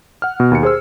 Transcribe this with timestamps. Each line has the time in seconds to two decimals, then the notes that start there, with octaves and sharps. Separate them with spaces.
0.22 F#5 F6
0.40 B2
0.51 D#2 C#7
0.63 G#4 C5 E6